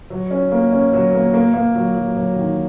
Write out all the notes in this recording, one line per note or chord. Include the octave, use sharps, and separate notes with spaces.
F#3
C#4
A#3
C#4
F#3
A#3
A#3
A#3
F#3
F#3
F#3
D#3